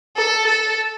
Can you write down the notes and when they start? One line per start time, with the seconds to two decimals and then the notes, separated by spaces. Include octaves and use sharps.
0.17 A4
0.46 A4